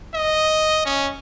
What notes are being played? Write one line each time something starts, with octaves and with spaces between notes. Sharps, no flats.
D#5
C#4